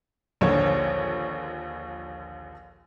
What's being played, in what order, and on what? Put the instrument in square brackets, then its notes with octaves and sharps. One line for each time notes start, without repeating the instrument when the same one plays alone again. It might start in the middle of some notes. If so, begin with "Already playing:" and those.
[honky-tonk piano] A#1 D#2 D3 F3 C#5